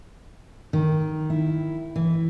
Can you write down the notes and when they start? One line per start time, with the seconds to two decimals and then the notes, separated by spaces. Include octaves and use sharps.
0.73 D#3
1.30 E4
1.96 E3